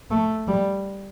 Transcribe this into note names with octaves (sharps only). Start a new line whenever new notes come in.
A3
G3